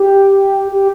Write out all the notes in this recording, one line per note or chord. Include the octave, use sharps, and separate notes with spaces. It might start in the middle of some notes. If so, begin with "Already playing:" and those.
Already playing: G4
G4